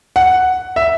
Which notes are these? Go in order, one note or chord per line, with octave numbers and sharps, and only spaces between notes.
F#5
E5